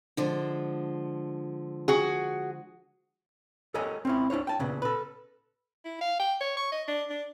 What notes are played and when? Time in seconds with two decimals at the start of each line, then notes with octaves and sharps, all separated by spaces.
0.17 D3 F3 G#3
1.88 F#4 G#4
3.74 G4 A4 A#4 C#5 D#5 G#5
4.05 C4 C#4 E4
4.30 D4 E4 C5 C#5
4.47 G5 A5
4.60 A#2 C#3 B3
4.82 A4 B4
5.85 E4
6.01 F5
6.20 G5
6.41 C#5
6.57 C#6
6.72 D#5
6.88 D4
7.10 D4